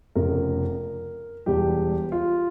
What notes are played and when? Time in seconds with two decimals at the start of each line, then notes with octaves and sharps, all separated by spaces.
0.15 F1 F2 C#3 A#4
1.46 E1 E2 E3 G3 G4
2.12 F4